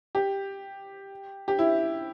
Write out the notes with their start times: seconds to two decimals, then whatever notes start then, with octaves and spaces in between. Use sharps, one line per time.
0.15 G4
1.48 G4
1.59 E4